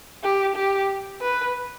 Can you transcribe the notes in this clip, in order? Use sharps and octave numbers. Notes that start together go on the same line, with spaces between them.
G4
G4
B4